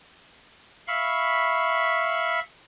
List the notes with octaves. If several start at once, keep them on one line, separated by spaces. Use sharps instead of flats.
E5 F5 B5 C#6